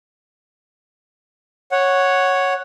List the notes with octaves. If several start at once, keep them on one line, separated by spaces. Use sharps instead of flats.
C#5 F#5